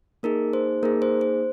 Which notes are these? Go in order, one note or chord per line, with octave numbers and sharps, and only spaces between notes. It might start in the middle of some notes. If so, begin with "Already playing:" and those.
A#3 D#4 G#4 A#4
C5
A#3 D#4 G#4 A#4
C5
C5